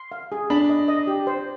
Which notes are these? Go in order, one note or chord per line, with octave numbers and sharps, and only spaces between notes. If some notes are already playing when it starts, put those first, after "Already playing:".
Already playing: C6
F5
G#4
D4 B5
D#5
D#5
G4
C5